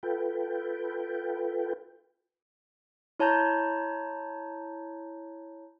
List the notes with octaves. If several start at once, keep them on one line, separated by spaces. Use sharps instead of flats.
F4 A4 B4 G5
E4 C#5 A5 A#5 G6